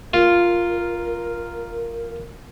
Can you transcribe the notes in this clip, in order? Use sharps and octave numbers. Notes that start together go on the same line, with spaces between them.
F4 A#4